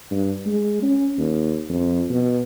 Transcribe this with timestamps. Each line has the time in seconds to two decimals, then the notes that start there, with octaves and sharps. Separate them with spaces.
0.11 G2
0.46 G#3
0.82 C#4
1.18 D#2
1.69 F2
2.10 B2